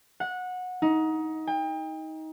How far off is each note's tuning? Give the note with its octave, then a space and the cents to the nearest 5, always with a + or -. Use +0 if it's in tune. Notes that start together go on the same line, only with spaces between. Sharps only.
F#5 -20
D#4 +20
G5 +35